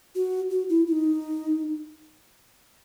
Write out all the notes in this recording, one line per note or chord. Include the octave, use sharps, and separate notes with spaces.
F#4
F#4
E4
E4
D#4